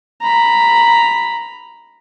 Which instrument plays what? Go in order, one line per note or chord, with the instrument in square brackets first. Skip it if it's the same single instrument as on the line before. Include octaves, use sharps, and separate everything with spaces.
[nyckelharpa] A#5 B5